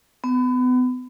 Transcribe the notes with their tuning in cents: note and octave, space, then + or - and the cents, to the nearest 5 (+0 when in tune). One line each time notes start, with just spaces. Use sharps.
B3 +30